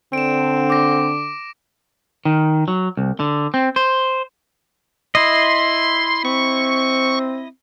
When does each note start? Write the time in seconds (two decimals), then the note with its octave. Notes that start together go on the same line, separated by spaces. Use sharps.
0.13 D3 C4 D7 E7
0.70 D6 A#6
2.25 D#3
2.68 F#3
2.97 C2
3.20 D3
3.54 C4
3.76 C5
5.15 E4 D#5 C6
6.25 C4 C#6